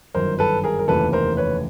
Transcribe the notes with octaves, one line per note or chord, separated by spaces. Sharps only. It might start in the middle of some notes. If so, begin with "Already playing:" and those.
G1 F#2 D#3 A#4 C5
A4 B4
G#4 A#4
A#4
F1 D#2 C#3 E3 A4 B4
A#4 C5
B4 C#5